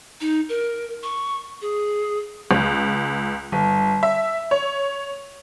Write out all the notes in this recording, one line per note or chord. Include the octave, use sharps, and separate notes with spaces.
D#4
A#4
C#6
G#4
C#2
G1
E5
C#5